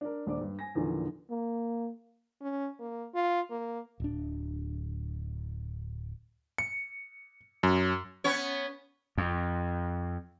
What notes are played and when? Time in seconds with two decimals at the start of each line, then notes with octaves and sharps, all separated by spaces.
0.01 D4 A#4
0.26 D#1 D4 D6
0.41 G2
0.59 G#5 A#6
0.75 E2 A#2 D3 D#3 F3
1.30 A#3
2.41 C#4
2.80 A#3
3.14 F4
3.50 A#3
4.00 D1 D4
6.58 C#7
7.63 F#2
8.24 B3 C#4 C#5
9.18 F2